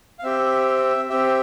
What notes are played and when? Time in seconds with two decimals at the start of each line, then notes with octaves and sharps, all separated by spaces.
0.19 F5
0.23 C4 G4 E5
1.09 C4 G4 E5